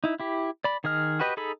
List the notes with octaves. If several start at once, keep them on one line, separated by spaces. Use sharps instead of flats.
D#4 E4
E4 G4
D5 B5
D#3 G#4 D#5 F6
F#4 G4 B4 D#5 G5
D#4 G#4 A4 B5